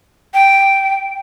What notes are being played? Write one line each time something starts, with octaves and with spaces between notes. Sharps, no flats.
G5